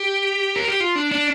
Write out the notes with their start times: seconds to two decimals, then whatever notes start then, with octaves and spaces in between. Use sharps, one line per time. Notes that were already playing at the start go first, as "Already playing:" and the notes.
Already playing: G4
0.56 A#4
0.68 G4
0.80 F4
0.95 D4
1.11 D4